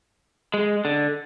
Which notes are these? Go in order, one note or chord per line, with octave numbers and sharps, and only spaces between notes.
G#3
D3